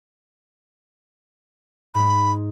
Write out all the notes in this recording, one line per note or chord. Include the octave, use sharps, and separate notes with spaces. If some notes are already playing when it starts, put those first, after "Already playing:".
G#2 G#3 B5